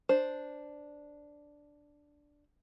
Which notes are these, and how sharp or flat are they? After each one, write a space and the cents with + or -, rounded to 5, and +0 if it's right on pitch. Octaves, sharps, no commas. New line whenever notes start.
D4 +0 C5 +0